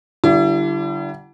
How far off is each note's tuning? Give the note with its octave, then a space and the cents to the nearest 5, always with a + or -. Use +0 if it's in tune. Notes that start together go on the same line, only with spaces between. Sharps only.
D3 +0 G3 -20 E4 +35